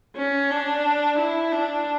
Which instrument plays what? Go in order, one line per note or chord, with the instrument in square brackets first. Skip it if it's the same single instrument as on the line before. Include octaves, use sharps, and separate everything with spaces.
[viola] C#4
D4
E4
D4